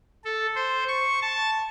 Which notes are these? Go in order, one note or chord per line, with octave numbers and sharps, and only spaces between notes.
A4
C5
C#6
A5